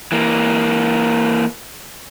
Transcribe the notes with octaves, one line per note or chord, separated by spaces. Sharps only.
E3 A#3